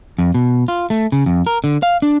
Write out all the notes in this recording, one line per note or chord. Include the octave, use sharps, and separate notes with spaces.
F2
B2
F4
A3
C#3
F2
A#4
D3
F5
D4